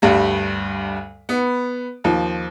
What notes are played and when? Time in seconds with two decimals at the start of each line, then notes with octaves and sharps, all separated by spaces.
0.02 D2 G2 G3
1.29 B3
2.04 D#2 F3